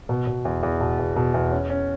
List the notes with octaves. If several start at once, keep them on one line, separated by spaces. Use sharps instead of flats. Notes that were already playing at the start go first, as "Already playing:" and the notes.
B2
B2
E2
E2
B2
E2
B2
E2
C#4
C#4